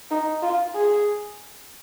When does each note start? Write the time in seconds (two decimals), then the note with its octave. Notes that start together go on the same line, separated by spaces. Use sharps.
0.11 D#4
0.43 F4
0.75 G#4